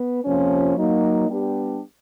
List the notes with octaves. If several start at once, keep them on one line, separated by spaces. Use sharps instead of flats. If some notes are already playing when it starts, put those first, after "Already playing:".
Already playing: B3
F2 C3 F3 A#3 C#4
F#3 A#3 D#4
G3 B3 D4 G4